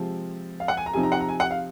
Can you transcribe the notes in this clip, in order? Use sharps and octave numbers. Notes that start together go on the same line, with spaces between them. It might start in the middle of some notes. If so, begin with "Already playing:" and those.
Already playing: C3 F3 G#3 C4
F5
F#5
G#5
A#5
C3 F3 C4 D#4 G#5
A#5
F#5
A#5
G#5
F#5
F5